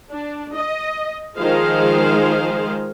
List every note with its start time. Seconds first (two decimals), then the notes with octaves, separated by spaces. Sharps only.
0.11 D4
0.56 D#5
1.38 D#3 F3 G#3 G#4 C5 F5